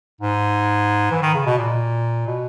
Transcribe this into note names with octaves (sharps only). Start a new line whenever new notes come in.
G#2
E3
D#3
C#3
B2
A#2
B2